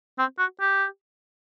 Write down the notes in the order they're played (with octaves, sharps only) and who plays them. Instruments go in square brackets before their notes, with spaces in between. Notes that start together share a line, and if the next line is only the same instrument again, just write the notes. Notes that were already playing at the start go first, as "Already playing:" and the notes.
[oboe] C4
F#4
G4